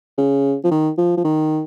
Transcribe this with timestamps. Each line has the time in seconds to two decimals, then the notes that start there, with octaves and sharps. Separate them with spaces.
0.18 C#3
0.64 F3
0.71 D#3
0.97 F3
1.17 F3
1.24 D#3